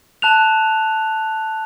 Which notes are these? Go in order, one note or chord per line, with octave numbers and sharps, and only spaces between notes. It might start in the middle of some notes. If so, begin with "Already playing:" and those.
A5 F#6 F7